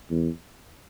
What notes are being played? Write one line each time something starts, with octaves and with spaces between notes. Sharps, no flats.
E2